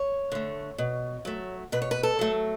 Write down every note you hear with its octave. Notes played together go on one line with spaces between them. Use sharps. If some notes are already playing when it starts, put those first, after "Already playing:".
Already playing: C#5
D3 A3
B2
F#3 A3
B2 B4
C#5
B4
A4
F#3 A3